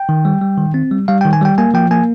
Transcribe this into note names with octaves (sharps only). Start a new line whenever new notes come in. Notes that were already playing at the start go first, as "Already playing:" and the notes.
Already playing: G5
D#3
G3
G3
D#3
C4
G3
G3 F5
G5
D#3
G#5
G3 G5
A#3 G#5
F3 G5
A#3 G#5